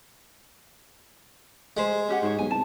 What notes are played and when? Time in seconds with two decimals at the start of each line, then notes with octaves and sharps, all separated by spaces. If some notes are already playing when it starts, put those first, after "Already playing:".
1.77 G#3 G4 C5
2.09 C#4 G4 F#5
2.23 G#2 C5 C#5
2.39 B1 G#5
2.51 C2 A5